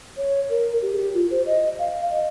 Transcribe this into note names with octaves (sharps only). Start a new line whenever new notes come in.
C#5
A#4
G4
G#4
G4
F4
C5
D#5
F5
D#5